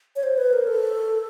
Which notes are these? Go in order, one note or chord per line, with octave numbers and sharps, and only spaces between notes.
C#5
C5
B4
A#4
A4